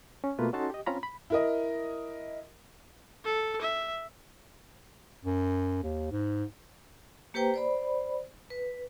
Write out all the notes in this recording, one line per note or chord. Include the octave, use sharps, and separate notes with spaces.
C#4
B2 A3 A#3 F4 B4
C#4 D#4 F#4 A4 A5 C6
G4 D#5
C4 C#4 F4 C#5 A#5 B5
B5
E4 A#4 D#5
A4
E5
F#2
D#2
G#2
A#3 G4 B4 C5 G5 A#5
C5 D5 B5
B4